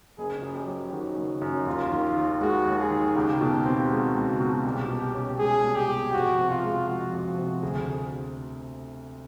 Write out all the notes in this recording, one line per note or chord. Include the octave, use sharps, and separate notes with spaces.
F#1 G#4
F#2
G4
F#3
D#3 F#4
F#1
F#2
D#2 F4
D#3
D#2
G#3 F#4
D#2
G#4
D#3
C#2 G4
B2
C4
G#3 F#4
C#2
B2
C2 G4
B2
C#4
G#3 G#4
C2
G4
B2
F2 F#4
C3
F4
G#3
F3 F#4
F2
C3
D2 G#4